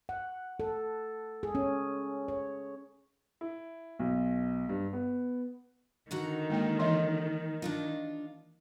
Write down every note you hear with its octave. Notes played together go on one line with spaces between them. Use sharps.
F#5
A4
G#4
C#4
C#5
E4
B1
G2
B3
D3 D#3 F#4 A#5
G#3 A#3 G5
E3 D#5 E5
D4 D#4 F4